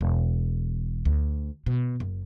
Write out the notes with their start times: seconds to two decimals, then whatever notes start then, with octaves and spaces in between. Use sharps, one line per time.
0.01 E1
1.05 D2
1.66 B2
2.00 F#1